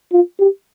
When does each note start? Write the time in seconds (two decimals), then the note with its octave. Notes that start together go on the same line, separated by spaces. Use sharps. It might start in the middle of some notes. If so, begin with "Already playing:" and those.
0.12 F4
0.39 G4